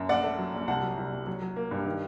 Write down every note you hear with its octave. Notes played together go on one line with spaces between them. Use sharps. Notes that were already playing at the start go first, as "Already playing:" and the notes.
Already playing: F#2
A#1 D5 F#5
A3
F#3
A#1
C2 F#5 A5
F#3
C2
C2
F#3
F#3
A#3
G2
D#3